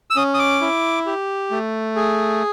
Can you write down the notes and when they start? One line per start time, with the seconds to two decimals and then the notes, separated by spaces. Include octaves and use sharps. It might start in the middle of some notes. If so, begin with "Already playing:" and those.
0.10 E6
0.16 C#4 D#6
0.34 D#6
0.39 D6
0.61 E4
1.06 G4
1.51 A3
1.96 G#4